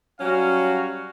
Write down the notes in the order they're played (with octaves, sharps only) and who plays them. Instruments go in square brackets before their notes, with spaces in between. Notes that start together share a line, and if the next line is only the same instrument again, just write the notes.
[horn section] F#3 G3 C#4 F#4 F5